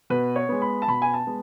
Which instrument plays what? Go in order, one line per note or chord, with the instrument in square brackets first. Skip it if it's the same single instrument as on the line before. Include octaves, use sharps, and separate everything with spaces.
[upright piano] B2 B4
C#5
G#3 B3
B5
A5
B2 B5
G#5
A5
G#3 B3